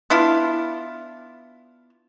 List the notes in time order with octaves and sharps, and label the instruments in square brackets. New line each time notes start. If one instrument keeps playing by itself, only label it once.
[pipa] B3 D4 E4 F4